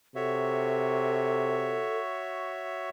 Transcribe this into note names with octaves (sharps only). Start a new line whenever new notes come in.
C3 F#4 A4 C#5 E5